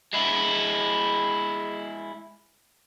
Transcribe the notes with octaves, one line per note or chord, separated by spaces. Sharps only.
G#3 E4